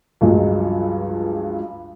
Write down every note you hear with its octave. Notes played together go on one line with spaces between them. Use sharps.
C#2 G2 F3 F#3 G#3